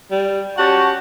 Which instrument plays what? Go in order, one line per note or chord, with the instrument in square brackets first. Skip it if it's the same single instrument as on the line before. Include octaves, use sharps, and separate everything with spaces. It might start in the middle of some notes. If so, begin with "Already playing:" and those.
[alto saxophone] G3
[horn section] C#4 G4 A5 [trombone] F#4 [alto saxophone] F#5